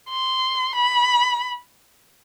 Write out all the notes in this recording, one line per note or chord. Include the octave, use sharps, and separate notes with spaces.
C6
B5